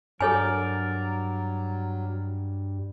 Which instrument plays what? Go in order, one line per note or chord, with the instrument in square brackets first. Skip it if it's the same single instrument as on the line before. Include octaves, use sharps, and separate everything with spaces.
[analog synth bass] G2 [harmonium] F#3 [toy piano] A4 C#5 G#5 [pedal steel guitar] A#4 D5